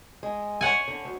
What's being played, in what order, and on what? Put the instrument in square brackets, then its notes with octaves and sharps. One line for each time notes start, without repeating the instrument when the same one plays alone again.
[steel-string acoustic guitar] G#3
[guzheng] C#5 F#5 G#5
[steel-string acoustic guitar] D3
D2